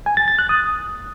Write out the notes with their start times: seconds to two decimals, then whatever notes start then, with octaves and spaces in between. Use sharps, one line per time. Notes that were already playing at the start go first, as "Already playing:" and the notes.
0.06 G#5
0.17 A6
0.28 A6
0.39 F#6
0.49 D#6